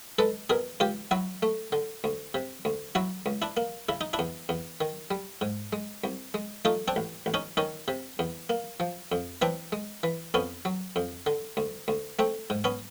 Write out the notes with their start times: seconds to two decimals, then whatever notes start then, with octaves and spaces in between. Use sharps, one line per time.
0.19 G#3 A4 B4
0.50 B2 G#4 A#4
0.80 C#2 F4 G4
1.11 F#3 E4 F#4
1.42 A3
1.72 D3
2.04 D2
2.34 C3
2.65 D2
2.95 F#3 E4 F#4
3.26 C#2
3.42 D4 E4
3.57 A#3
3.89 C#3 E4
4.01 D#4
4.13 D4 E4
4.19 E2
4.49 E2
4.81 D#3
5.11 G3
5.41 G#2
5.73 G#3
6.04 C2
6.34 G#3
6.65 A3 D#4 F4
6.88 C4 D4
6.96 A1
7.26 A1
7.34 C#4 D#4
7.57 D#3 C#4 D#4
7.88 C3
8.19 E2
8.49 A#3
8.80 F3
9.12 F2
9.42 E3 C4 D4
9.72 G#3
10.03 E3
10.34 F2 B3 C#4
10.65 F#3
10.96 F2
11.26 D3
11.57 D2
11.88 D2
12.19 A3 C4
12.50 G#2
12.64 B3 C#4